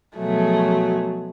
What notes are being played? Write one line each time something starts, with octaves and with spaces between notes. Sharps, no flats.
B2 F3 F#3 A3 G#4